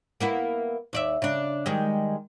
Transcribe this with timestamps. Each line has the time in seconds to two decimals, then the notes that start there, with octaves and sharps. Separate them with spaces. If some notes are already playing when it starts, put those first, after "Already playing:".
0.20 A#3 B3 E4
0.93 D#2 D5 E5
1.22 C#3 D4
1.66 D#3 G3 G#3